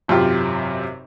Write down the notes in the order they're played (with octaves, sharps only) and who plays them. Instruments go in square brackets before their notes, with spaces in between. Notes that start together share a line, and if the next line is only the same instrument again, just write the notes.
[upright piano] G#1 F#2 C3 F4 G4